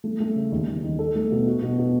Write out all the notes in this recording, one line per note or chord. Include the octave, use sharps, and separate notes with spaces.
A3
A3
C#3
D#2
D#2
D#3
A4
A3
B2
F#4
B2
B2